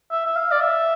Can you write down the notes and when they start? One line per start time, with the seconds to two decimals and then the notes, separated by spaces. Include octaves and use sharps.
0.11 E5
0.26 E5
0.36 F5
0.51 D5
0.61 E5